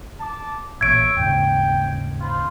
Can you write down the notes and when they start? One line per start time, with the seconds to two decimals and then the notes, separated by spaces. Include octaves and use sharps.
0.20 A5 D6
0.81 A1 A#2 C#5 E5 G#6 D7
1.17 D#2 G#2 C#3 G5
2.20 F4 C5 B5